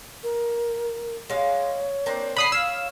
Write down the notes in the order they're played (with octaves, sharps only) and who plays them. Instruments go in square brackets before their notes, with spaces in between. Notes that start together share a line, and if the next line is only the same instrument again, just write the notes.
[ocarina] A#4
[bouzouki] G#3 F5 [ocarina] C#5
[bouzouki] A#3 C4 D4
[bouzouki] D3 [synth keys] B5 D#6 C7
[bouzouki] C#5 [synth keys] F5 E6